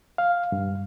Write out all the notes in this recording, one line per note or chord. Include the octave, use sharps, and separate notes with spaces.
F5
G2